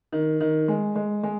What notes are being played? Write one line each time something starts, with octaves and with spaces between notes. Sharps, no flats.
D#3
D#3
G#3
G#3
G#3